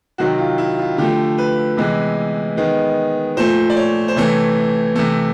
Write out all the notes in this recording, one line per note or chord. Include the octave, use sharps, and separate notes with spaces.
C3 D#3 F#3 F#4
F4
E4
F4
D3 F3 A3 G4
B4
C3 E3 G#3 B3 B4
D#3 G#3 B3
A#2 F3 A3 C5
D5
C#5
C5
C3 E3 A3 C#5
C3 E3 A3